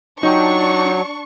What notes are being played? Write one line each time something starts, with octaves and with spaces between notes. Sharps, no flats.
F#3 D4 D#4 F4 G5 C#6